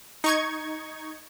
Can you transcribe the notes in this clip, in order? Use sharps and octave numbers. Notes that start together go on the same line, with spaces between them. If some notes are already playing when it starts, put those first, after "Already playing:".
D#4 C#6 G#6